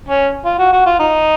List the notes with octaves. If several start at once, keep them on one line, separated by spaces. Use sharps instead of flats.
C#4
F4
F#4
F#4
F4
D#4